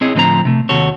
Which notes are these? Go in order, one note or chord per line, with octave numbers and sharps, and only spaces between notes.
C4 E4 G#4 C#5 D#5
A2 D3 F3 C4 C5 A#5
C3 A3
D#2 C3 F#4 A4 C#5